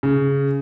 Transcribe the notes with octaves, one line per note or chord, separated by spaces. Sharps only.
C#3